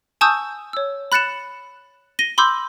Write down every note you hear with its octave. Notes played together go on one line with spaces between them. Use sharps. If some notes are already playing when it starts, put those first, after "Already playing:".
G#5 A5 C#6 D#6 E6 G6
C#5 E6
B5 F#6 A6 C#7 E7
A#6 D#7 G7
B5 C6 D6 E6 G6